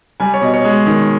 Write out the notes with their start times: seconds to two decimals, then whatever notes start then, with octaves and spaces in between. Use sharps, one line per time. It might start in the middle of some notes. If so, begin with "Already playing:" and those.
0.20 G3 G#5
0.34 C#5
0.41 B2 D#5
0.54 C#5
0.64 G#3
0.87 D#3